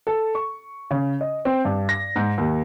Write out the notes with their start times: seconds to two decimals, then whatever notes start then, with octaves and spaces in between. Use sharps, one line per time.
0.07 A4
0.35 C#6
0.91 C#3
1.21 D#5
1.45 C4
1.65 G2
1.89 A#6
2.16 G#2
2.38 D#2